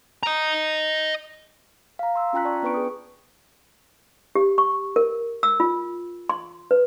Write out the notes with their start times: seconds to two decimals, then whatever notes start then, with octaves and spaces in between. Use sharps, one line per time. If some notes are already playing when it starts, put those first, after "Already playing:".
0.23 D#5 A#5
1.99 F5 A#5
2.16 C6 E6
2.33 C#4 F4 G5 A#5 F#6 B6
2.45 D5 A5 C#6
2.62 B3 D4 B4 G5 C#6 D7
2.74 G#4 D#6
4.35 G4
4.58 C#6
4.96 A#4
5.43 E6
5.60 F4
6.29 C6
6.71 B4